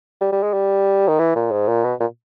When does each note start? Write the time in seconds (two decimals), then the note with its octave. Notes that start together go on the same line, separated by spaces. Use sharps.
0.21 G3
0.32 G3
0.43 G#3
0.53 G3
1.08 D#3
1.19 E3
1.35 A#2
1.51 G#2
1.68 A#2
1.84 B2
2.00 A#2